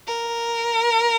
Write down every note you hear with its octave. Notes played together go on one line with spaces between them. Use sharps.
A#4